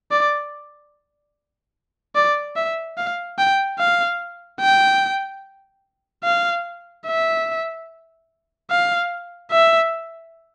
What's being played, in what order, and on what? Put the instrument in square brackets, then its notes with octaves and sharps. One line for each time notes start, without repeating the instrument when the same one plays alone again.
[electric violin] D5
D5
E5
F5
G5
F5
G5
F5
E5
F5
E5